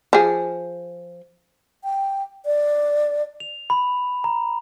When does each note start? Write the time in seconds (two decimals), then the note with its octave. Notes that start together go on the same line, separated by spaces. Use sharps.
0.13 F3 G#4
1.84 G5
2.46 D5
3.40 F7
3.70 B5
4.24 A#5